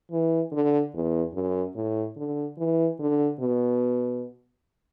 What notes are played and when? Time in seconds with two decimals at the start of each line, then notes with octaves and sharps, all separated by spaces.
0.12 E3
0.52 D3
0.94 E2
1.34 F#2
1.75 A2
2.17 D3
2.58 E3
3.00 D3
3.40 B2